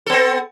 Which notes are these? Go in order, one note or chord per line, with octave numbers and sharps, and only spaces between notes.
B3 C4 A4